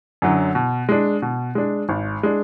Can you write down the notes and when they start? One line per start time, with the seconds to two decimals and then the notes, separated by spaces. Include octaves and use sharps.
0.22 F#2 D3 F#3
0.55 B2
0.89 G#3 D4
1.22 B2
1.55 G#3 D4
1.89 G#1
2.23 G#3 D4